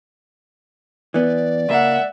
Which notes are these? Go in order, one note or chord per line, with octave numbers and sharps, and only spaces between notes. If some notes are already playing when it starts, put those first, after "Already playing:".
E3 B3 D5
C#2 A#3 E5 F#5